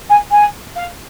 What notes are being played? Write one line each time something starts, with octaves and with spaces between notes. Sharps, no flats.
G#5
G#5
F5